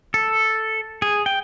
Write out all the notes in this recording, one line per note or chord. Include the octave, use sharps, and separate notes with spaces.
A4
G#4
G5